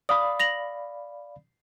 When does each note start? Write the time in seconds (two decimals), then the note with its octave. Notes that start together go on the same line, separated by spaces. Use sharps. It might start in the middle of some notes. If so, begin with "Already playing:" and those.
0.09 D5 F5 B5 D#6
0.40 A#6 F7 F#7